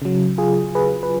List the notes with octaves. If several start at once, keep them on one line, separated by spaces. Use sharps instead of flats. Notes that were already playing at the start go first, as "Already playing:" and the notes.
C#3 F#3
F4 G#4
G#4 B4
B4